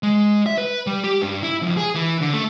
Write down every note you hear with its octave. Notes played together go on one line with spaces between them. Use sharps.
G#3
E5
B4
G3
G4
G2
E4
F2
G#4
E3
D3
A3